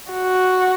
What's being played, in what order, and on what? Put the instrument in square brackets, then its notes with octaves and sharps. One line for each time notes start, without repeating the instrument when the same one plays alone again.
[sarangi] F#4